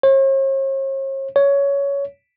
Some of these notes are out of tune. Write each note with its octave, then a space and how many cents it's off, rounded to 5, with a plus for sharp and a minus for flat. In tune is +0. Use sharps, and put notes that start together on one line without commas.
C#5 -45
C#5 +15